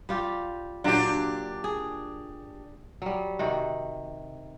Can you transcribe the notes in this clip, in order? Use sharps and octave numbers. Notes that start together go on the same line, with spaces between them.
G3 F4 G4
A#2 F#3 D4 F4 G4
G#4
F#3 G3
C3 D#3 F#4